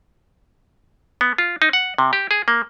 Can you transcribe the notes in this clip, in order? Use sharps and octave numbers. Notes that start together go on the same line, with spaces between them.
B3
F4
D#4
F#5
C3
G4
G#4
A#3